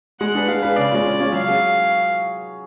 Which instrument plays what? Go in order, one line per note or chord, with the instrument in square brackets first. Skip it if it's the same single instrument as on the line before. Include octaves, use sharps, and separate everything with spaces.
[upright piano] G#3 [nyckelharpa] F#5
[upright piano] D4 G#4 B4
[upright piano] G#3 [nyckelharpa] F5
[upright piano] D4 G#4 B4
[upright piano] C#3 [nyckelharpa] D5
[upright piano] G#3 C#4 F4
C#3
G#3 C#4 F4
[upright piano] F#3 [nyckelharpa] F5
[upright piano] C#4 G#4